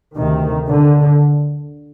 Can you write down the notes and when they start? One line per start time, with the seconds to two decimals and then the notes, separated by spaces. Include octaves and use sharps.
0.16 D2 C3 D#3
0.69 D3